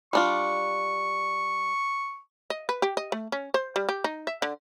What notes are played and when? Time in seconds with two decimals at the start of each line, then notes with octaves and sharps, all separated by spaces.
0.13 G3 D4 F4 C#6
2.50 D#5
2.69 B4
2.82 G4
2.97 D#5
3.12 A3
3.32 C#4
3.54 C5
3.76 G3
3.89 G4
4.04 D#4
4.27 E5
4.42 D3